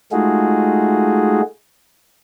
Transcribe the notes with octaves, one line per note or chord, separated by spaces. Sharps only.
G#3 A3 D#4 F4 F#4 G#4